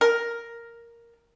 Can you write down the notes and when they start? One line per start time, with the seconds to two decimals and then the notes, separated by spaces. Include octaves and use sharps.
0.01 A#4